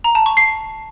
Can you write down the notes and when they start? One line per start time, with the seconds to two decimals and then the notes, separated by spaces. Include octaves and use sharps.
0.04 A#5
0.15 A5
0.26 C#6
0.37 C7